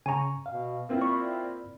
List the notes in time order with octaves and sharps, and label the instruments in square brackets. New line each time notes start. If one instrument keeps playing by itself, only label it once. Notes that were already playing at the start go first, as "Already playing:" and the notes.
[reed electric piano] C#3 C#6 [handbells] G#5 A#5
[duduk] B2 [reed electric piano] F5
[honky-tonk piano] A#3 C4 E4 [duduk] F4
[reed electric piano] D5 B5 [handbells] C#6